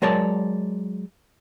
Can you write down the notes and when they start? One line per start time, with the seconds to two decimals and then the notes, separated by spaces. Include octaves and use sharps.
0.02 F#3 G#3 A#4 C#5 D5 A5